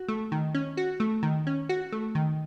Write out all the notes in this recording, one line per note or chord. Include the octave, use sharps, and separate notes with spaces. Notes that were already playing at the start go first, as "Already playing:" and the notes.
Already playing: F#4
A3
D#3
C#4
F#4
A3
D#3
C#4
F#4
A3
D#3